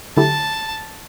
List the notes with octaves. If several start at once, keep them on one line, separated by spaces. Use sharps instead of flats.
D3 F#3 A3 E4 G4 A5